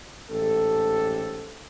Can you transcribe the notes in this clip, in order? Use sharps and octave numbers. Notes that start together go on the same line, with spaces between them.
A1 G#2 G4 A4